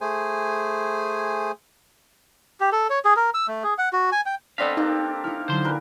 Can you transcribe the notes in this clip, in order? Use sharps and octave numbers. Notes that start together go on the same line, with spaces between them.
A3 G#4 C5 G#5
G4
A4
C#5
G#4
A#4
E6
A3
G#4
F#5
F#4
G#5
G5
B3 C4 D4 A4 D5 D#5 F5 B6
A#3 D4 D#4 G4
D#4 E4 F6
D3 F#3 C5 C6
A#2 A#4 B4